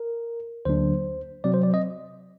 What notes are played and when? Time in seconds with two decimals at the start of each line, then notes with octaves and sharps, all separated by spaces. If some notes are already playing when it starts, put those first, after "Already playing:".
Already playing: A#4
0.65 D2 D3 F#3 A#3 D4 C5
1.44 C3 F#3 C4 D5
1.54 C5
1.63 D5
1.74 D#5